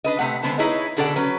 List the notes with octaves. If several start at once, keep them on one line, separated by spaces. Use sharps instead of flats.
D4 B4 D#5
C3 A3 F#5
D3 G#3 B3 C5 A5
D#4 E4 G#4 B4 C#5 D#5
B2 D3 G#4 A4 D5 F#5
F#3 C#4 B4